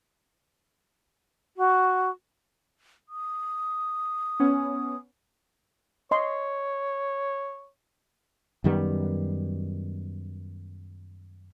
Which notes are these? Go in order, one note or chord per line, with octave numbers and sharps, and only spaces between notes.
F#4
D#6
B3 C#4
C#5 D#5 C6
F#2 D#3 G3 B3